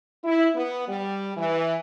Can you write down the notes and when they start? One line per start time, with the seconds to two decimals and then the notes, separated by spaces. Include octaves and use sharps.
0.25 E4
0.56 B3
0.89 G3
1.37 E3